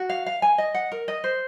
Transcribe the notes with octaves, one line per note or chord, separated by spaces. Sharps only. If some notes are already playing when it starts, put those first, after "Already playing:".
Already playing: F#4
F5
F5
G#5
D#5
F#5
A#4
D#5
C5